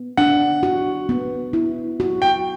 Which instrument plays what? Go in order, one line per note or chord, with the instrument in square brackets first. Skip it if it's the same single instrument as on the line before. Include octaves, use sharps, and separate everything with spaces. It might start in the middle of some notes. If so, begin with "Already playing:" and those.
Already playing: [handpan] B3
[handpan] D4 [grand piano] F#5
[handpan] F#4
B3
E4
F#4
[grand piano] G5